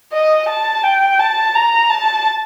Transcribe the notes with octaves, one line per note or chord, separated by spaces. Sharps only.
D#5
A5
G5
A5
A#5
A5